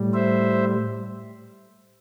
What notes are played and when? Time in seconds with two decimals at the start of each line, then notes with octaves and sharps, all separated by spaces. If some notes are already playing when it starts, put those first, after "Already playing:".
Already playing: A2 G3
0.13 C5 E5